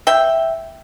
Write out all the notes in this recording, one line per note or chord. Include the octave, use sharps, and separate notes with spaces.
E5 G5